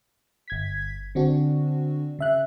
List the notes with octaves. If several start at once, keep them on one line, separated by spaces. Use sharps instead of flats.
G1 G#6 B6
D3 C4 D4 F#4
C#3 E5 F#6